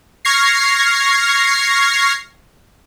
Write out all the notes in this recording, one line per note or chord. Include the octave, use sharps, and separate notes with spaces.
C#6 F6 G#6 A#6 C7